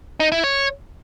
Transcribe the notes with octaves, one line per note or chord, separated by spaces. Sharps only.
D#4
E4
C#5